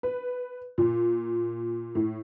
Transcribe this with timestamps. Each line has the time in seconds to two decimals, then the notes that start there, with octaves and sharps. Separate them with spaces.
0.03 B4
0.78 A#2
1.95 A2